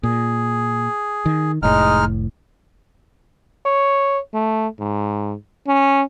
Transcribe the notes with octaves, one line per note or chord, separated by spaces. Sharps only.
A#2 G#4
D#3
F1 A2 G#3 D#4 F6
C#5
A3
G#2
C#4